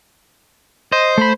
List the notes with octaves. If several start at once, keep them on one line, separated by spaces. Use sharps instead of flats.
C5 D#5
A3 B5